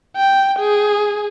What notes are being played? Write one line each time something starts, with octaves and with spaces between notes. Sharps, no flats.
G5
G#4